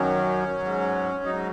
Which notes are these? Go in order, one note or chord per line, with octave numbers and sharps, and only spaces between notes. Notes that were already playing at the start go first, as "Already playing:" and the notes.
Already playing: F#2 D#3 F#3 C#4
G#2 F#3
G#2 F#3 D#4